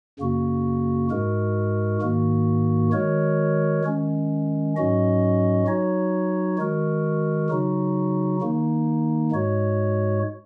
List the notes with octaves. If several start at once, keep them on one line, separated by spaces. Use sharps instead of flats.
F#2 C#3 A#3 F#4
G#2 G#3 F#4 A#4
G#2 D#3 A#3 F#4
D#3 G#3 F#4 A#4 C#5
D#3 G#3 C#4
G#2 F#3 C#4 F#4 D#5
F#3 D#4 F#4 C#5
D#3 G#3 F#4 A#4
C#3 F#3 D#4 F#4
D#3 A#3 D#4
G#2 G#3 F#4 C#5